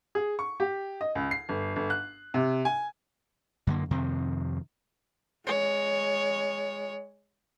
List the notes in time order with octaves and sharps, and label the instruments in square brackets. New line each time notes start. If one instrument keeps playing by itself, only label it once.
[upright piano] G#4
C#6
G4
D#5
C#2
C7
G1
G1
F#6
C3
G#5
[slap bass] F#2 D3 A#3
F2 C3 D#3 C4
[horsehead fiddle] G#3 C#5